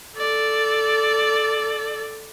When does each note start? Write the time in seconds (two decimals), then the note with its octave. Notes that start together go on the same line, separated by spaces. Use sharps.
0.16 A4 D5